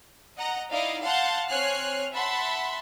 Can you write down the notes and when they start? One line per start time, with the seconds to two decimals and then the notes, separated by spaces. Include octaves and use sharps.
0.37 D#5 F#5 A#5
0.71 D#4 E4 D5 D#5 F5
1.03 F5 F#5 A5 C6 G6
1.48 C4 C#5 G#5 F6 F#6 C7
2.13 E5 F#5 A5 B5 C6